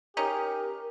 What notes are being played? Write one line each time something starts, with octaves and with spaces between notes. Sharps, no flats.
C#4 D#4 G4 A#4